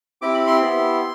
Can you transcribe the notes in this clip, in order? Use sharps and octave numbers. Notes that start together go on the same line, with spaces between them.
C4 E4 G4 D6
B5
C6
B3 E4 G4